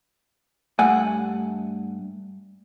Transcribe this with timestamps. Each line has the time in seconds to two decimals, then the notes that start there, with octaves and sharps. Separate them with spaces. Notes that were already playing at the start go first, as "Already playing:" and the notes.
0.79 G2 A3 F#5 G#5